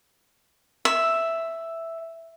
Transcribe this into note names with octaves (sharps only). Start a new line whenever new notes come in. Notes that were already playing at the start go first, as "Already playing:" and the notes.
E5